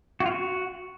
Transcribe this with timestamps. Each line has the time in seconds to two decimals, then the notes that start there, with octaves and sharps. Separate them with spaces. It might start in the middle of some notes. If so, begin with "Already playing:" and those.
0.20 F#4
0.26 F4
0.31 F#4